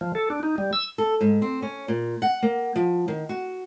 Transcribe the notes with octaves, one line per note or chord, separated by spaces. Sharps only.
F3
A4
D4
D#4
G3
E6
A4
G#2
C4
C#4
A#2
F#5
A#3
F3
D#3
F#4